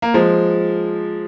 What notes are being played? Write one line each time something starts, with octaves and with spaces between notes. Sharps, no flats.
A#3
F3 G#3